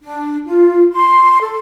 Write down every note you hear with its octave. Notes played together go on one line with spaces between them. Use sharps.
D4
F4
C6
A4